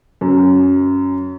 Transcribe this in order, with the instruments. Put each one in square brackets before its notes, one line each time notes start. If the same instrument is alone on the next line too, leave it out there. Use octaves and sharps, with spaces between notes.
[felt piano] F#2